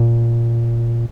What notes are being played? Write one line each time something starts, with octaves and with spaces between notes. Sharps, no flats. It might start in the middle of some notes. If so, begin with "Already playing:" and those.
Already playing: A#2